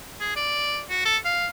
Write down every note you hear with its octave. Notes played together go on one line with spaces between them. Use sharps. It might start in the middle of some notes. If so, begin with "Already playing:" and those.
G#4
D5
F#4
A4
F5